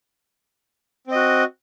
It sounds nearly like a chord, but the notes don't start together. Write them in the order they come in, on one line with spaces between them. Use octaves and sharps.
C4 D#5 F#4